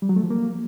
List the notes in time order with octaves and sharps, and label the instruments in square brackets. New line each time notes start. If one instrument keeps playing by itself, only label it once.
[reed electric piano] G3
F#3
A3
F3
A#3